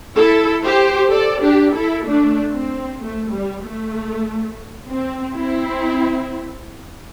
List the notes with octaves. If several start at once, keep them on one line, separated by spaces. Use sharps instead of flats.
E4 A4
G4 C5
A4 D5
D4 G4
E4 A4
A3 D4
C4
A3
G3
A3
C4
C4 E4